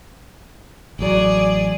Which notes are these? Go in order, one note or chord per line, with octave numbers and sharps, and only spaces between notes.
A1 F#3 G#4 D5